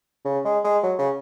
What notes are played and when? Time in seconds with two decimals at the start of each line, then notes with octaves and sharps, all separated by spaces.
0.25 C#3
0.44 G#3
0.64 G#3
0.83 F#3
0.98 C#3